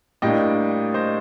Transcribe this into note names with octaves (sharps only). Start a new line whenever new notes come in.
A2 G3 A#3 D4 D#5 G5
C5 D#5